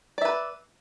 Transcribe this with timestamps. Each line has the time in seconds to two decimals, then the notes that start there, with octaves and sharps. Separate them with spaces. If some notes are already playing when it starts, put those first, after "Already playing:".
0.18 D5
0.22 E5
0.25 B4